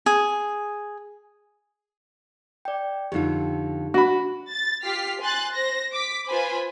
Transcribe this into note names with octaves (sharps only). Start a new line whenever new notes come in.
G#4
D5 G5
F2 D3 D#4 F4 G4
D4 F#4 B5
A6
F4 G4 F6 B6 C7
G#5 C6 F#6 A6
C5 A#6
D6 B6
F4 B4 C5 G#5 B5